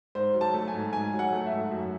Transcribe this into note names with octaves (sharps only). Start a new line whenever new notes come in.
G#2 C5
F#3
A5
A3
G#5
G#2
G#2 G#5
F#3
F#5
A3
E5
G#2
F#2